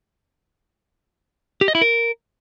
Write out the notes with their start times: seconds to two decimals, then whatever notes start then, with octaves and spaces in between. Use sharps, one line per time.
1.61 G4
1.68 D#5
1.75 E4
1.82 A#4